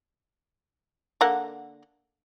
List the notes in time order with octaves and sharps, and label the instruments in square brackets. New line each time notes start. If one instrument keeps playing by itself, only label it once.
[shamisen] D3 A#3 F#5